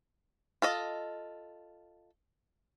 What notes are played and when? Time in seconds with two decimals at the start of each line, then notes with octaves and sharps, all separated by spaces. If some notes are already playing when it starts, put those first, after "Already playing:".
0.62 F4 A4 D#5